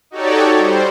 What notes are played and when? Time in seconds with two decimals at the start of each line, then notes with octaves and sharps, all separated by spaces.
0.11 D#4 F#4 G4 A4 C#5 D5
0.56 G3 C5